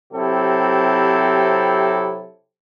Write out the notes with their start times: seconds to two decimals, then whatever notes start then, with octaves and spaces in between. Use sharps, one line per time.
0.13 C3 F#3 C4 E4 G4 A4